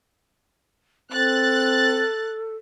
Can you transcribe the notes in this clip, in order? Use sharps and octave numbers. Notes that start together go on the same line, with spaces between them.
C4 A4 F#6 A6